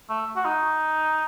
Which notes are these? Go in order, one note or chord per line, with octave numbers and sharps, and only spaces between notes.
A3
F#4
D#4